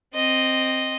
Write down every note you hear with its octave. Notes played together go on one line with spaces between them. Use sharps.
C4 D#5